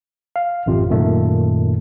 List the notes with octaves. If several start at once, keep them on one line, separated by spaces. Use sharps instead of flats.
F5
A1 F#2 C3 F4
F#2 A#2 D#3 A3